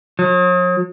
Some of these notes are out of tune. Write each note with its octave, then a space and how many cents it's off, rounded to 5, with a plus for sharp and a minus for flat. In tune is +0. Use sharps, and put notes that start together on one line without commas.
F#3 -45